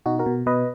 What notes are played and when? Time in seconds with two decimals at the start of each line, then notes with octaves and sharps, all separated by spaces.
0.06 B2 D#4 F#4
0.19 F#4 A#4
0.26 B2
0.46 B2 B4 D#5